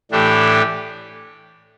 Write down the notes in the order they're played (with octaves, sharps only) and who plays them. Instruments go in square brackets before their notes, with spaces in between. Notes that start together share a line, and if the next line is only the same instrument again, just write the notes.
[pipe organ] A2 E3 A3 D4 G4